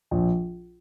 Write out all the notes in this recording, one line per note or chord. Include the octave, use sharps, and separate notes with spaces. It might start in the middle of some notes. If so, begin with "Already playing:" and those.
A#1